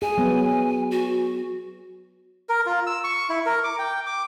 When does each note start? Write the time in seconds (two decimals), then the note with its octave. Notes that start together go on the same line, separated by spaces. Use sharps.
0.02 G#4 G#5
0.18 F#3 B3
0.91 F#4
2.49 A#4
2.66 F4
2.87 E6
3.04 C#6
3.30 E4
3.46 A#4
3.64 D6
3.79 G5
4.06 D6